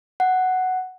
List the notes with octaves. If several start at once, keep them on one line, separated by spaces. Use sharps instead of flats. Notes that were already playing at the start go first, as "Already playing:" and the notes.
F#5